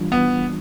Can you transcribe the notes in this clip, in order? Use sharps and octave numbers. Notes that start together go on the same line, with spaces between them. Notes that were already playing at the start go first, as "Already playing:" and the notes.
Already playing: E3 G3 D4 F4
B3